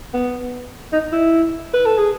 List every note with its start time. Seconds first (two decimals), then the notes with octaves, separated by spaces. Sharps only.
0.14 B3
0.92 D#4
1.12 E4
1.74 B4
1.86 A4
1.98 G#4